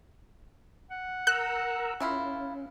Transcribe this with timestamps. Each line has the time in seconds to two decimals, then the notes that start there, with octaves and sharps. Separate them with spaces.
0.91 F#5
1.27 A#4 A#5 E6 F#6
2.00 C#3 C#4 E4 F4